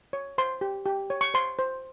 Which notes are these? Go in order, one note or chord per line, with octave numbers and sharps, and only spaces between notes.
C#5
C5 C6
G4
G4
C#5
C#6
C5 C6
C5